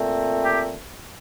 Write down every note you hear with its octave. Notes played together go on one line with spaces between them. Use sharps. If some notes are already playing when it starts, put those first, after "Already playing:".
Already playing: A#2 A3 C4
G4 G5